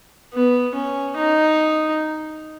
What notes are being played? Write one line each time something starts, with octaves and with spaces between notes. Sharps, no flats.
B3
C#4
D#4